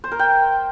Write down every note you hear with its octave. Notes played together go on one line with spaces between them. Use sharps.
C5
A#4
G5